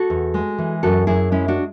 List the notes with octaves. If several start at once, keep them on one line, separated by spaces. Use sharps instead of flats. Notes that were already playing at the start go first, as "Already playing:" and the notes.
Already playing: F#4 A4
E2
G#3
E3
F#2 F#4 A4
F#2 E4 G#4
G#3 C#4 E4
D4 F#4